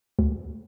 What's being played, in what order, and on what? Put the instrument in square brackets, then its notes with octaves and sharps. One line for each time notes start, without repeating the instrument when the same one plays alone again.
[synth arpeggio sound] D2